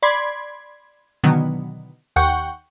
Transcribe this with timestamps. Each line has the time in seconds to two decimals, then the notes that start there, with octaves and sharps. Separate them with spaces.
0.03 D5 B5 C6 G#6
1.24 B2 D3 D#3 F#3 B3
2.16 D#2 F#5 G5 C#6